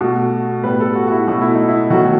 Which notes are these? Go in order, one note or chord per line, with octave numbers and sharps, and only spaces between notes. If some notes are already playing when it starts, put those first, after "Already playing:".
B2 A3 F#4
A2 G3 B4
A4
F#4
F#4
E4
B2 F#3 A3 F#4
E4
D#4
E4
D#3 F#3 A3 F#4